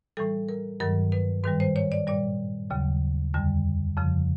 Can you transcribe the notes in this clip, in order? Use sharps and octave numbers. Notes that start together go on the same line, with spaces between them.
A2 E3 G3 A4
A#4
G2 D#3 F#3 A#4
B4
G#2 D#3 G3 B4
C5
C#5
D5
A#2 G3 D5
D#2 C#3 F#3
F2 D3 G3
F2 C#3 F3